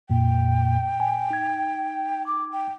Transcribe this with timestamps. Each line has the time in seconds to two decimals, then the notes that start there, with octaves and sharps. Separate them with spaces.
0.10 F2 A#2 A#3 G5
1.00 G#5
1.30 D#4 G#6
2.27 D6
2.52 G5